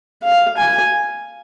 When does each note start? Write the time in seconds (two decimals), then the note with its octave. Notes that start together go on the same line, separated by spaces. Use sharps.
0.23 F5
0.57 G#5